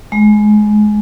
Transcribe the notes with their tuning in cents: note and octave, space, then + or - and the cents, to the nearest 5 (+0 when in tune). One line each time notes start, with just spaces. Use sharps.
G#3 +20